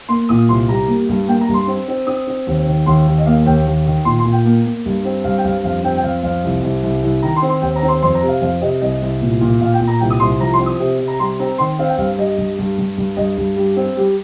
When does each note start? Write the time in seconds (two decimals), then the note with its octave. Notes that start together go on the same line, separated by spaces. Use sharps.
0.09 A#3 C6
0.29 A#2 D#6
0.48 C2 C6
0.69 G3 A#5
0.88 A#3
1.09 G2
1.28 A#3 G5
1.41 A#5
1.49 G2
1.54 C6
1.68 C4
1.88 C4
2.07 C4 D#6
2.27 C4
2.47 D#2
2.66 D#3
2.86 D#2 C6
3.07 D#2
3.18 D#5
3.26 A#3 F5
3.46 D#2 G5
3.66 D#2
3.86 D#3
4.05 A#2 C6
4.19 C6
4.25 A#2
4.32 G5
4.45 A#3
4.66 A#3
4.86 G2
5.05 C4
5.24 G2 F5
5.38 G5
5.45 G2 F5
5.64 F2 F5
5.83 C4 G5
5.97 G5
6.03 F2 F5
6.23 F2 F5
6.44 C2
6.63 C2
6.83 C2
7.03 C2
7.22 D#3 A#5
7.36 C6
7.42 C4
7.49 C6
7.62 D#2 G5
7.76 A#5
7.83 C4
7.88 C6
8.03 F2 C6
8.15 A#5
8.22 C3
8.28 F5
8.41 F2 F5
8.61 C3 D#5
8.82 C2 D#5
9.02 C2
9.22 A#2
9.41 A#2
9.61 A#2 F5
9.74 G5
9.80 A#2
9.88 A#5
10.00 C2 G5
10.10 D#6
10.20 C2 C6
10.40 F3 A#5
10.54 C6
10.60 C4
10.66 D#6
10.79 C3
10.99 C3
11.08 A#5
11.19 G3 C6
11.39 C4 A#5
11.58 D#3 C6
11.79 C4 F5
11.89 G5
11.98 G2 F5
12.18 G3 D#5
12.38 G2
12.59 G2
12.78 G2
12.98 G2
13.17 G2 D#5
13.37 G2
13.57 G3
13.76 C4
13.97 G3